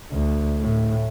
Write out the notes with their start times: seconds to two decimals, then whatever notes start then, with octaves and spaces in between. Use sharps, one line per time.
0.12 D2
0.61 A2